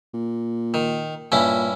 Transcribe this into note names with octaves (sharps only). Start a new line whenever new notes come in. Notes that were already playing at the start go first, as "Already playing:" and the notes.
A#2
D#3
G2 A#2 C#4 E4